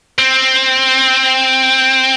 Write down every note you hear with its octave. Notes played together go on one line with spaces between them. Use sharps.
C4